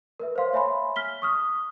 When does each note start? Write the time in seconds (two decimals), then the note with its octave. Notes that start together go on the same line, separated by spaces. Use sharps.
0.20 A#4 B4 E5
0.36 C5 C#5 F5 C6
0.53 C#5 E5 G#5 B5 C6
0.96 F6 B6 G7
1.22 C#6 D#6 F6